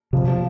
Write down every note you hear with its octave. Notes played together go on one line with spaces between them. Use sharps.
C3 F3
F3